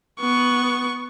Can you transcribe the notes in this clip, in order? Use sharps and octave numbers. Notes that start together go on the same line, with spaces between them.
B3 C#6